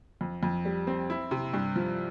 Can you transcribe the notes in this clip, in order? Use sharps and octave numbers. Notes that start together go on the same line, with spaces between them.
F2
F2
G3
C4
E4
C3
G2
F3